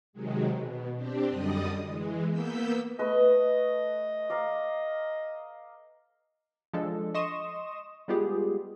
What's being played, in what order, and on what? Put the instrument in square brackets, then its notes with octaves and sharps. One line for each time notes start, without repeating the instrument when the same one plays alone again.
[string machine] C3 D#3 F#3 G#3
B2
C4 D4 G4
F#2 D3 G3 D5 D#5 D#6
E3 G#3
A#3 B3 E6 G6 B6
[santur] A3 B4 [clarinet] D#5
[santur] D5 F5 A#5
[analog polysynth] F3 G#3 D4 A4
D#5 C6 C#6 D#6 E7
G3 G#3 B3 F4 G4 G#4